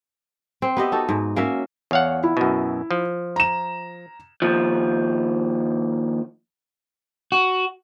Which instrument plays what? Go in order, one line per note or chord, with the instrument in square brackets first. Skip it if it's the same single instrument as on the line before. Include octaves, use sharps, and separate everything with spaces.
[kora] C4
B3 G4 D#5 E5
D#4 F#4 A4
G#2
A#3 C#4 F#4 E5
[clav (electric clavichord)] E2 F5 F#5 [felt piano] C#5
[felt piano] E4
[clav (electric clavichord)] F#2 B2
F3
[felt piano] A#5 E7
[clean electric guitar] D#2 F3
[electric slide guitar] F#4